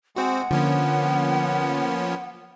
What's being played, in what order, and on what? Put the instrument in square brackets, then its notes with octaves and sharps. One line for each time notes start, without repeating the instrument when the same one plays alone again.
[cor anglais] G#3 [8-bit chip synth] C4 F#4 [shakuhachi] F#5
[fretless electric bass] D3 [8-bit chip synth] F3 A#3 C#4 [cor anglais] B3